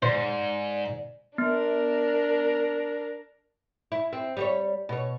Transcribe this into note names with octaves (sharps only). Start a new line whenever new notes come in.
G#2 C5 D5
B3 D4 A#4
E4
C4
G3 F#4 C#5
B2 C#5